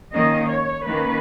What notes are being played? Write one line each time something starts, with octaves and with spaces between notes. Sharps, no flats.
D#3 A#3 C#4 D#5
C#5
D#3 A#3 C#4 B4